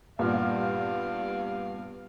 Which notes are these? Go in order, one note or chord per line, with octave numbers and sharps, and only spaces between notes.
G2 A#2 G3 A#3 B3 F4 F5 F6